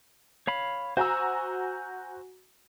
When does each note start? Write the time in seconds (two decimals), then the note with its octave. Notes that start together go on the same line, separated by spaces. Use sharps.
0.47 C#5 F5 B5
0.97 F#4 C5 G#5 A#5 E6